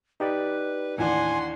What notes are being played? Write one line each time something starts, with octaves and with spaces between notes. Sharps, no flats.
D#4 G4 B4 D5
D#2 A2 E3 D4 F#5 G#5 C6